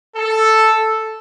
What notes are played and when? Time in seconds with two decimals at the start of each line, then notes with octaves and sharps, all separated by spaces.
0.17 A4